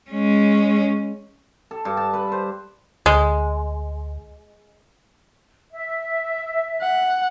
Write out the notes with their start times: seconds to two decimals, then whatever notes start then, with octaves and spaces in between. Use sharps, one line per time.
0.11 G#3 C#4
1.71 A4
1.85 G2
1.97 A5
2.13 B4
2.32 C5
3.06 D2 G#3
5.72 E5
6.82 F#5